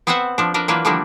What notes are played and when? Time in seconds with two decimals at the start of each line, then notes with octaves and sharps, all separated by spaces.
0.07 B3 C4 B4 C5 E5 F#5
0.38 F3 D4
0.54 D4 A#4 B4
0.68 E3 F#3 A#3 D4 F4 B4
0.85 D3 F3 G3 A3 A#3 D4